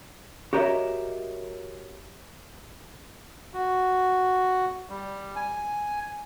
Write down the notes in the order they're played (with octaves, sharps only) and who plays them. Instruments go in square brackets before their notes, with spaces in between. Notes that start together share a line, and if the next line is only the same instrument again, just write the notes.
[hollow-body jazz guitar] F#4 G4 A#4 C#5 D#5 E5
[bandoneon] F#4
G3
G#5